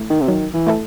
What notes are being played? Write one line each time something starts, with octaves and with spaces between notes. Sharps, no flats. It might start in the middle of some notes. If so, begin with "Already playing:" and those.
Already playing: A3 E4
D#3
C3
D#3 F#3
E3
A3 E4 A4